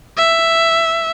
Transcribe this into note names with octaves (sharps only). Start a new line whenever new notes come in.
E5